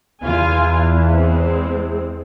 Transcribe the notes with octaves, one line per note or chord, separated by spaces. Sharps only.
E2 E3 F4 F5 G#5
G#3 C4